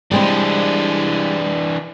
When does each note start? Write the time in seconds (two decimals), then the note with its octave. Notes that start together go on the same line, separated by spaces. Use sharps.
0.11 E3 G3 G#3 C4 D4